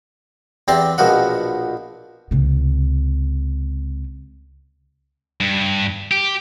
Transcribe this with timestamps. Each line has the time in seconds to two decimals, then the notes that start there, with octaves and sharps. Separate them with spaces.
0.68 E2 C4 G4 D5 A#5 C6
0.98 A#1 B2 F3 A#4 D#5 F#5
2.31 C#2 C3
5.40 G2
6.11 G4